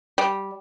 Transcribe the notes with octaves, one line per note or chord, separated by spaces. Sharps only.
G3